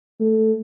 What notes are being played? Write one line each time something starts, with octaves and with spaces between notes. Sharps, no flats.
A3